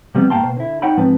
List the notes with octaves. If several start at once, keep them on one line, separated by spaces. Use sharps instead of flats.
C3 F3 G3 B3 C4
G#2 A#3 F5 G5 A5 C6
B2 C5
D3 E4
D#4 C#5 F#5 G5 B5
G#2 F3 C4 B4 A5